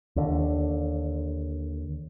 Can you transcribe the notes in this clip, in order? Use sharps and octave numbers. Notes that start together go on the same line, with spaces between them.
D#2 D3